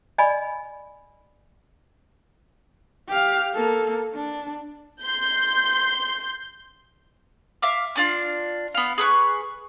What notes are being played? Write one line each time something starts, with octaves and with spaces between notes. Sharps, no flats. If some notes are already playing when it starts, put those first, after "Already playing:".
D5 D#5 G#5 B5
G4 F5
A#3 A4
D4
C6 G6
E5 F5 D6
C#4 D4 F4
B3 F5
G#4 B4 C#6 F#6